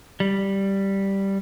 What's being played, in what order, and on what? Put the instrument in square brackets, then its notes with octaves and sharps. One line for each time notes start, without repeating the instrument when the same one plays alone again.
[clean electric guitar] G3